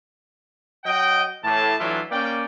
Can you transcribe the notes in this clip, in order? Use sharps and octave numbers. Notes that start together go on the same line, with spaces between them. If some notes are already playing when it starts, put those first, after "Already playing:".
F#3 D#5 F#5 G5
A2 E3 A5
E3 F#3 A3 D4 E4 F4
A#3 C#4 D5 G5